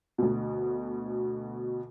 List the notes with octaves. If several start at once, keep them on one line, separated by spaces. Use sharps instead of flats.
D2 B2